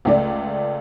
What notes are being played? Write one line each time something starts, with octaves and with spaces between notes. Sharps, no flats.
C#2 A3 D5